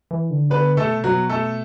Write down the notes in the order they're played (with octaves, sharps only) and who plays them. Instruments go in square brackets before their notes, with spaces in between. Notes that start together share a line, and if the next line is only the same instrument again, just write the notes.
[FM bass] E3
D3
[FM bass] D3 [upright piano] B3 B4
[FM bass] B2 [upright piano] A3 A4
[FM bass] B2 [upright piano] F#3 F#4
[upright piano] A3 A4